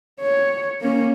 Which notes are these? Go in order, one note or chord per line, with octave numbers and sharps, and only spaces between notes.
C#5
A#3 C#4